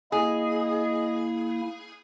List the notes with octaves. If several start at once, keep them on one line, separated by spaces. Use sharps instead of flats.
A#3 E4 G#4 D#5